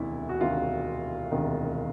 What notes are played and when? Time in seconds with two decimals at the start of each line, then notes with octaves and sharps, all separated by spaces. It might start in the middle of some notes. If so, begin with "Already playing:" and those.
Already playing: E1 D2 C3 D#3 E4
0.29 F#4
0.41 E1 D2 C3 D#3 F4
1.31 E1 D2 C3 D#3